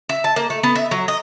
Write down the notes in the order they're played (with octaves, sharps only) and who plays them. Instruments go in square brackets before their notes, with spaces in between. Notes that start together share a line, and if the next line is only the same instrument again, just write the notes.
[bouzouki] E5
A5
A#3
A3
B3
E5
F#3
D#5